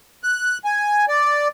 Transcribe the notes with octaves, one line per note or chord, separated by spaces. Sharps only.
F#6
G#5
D5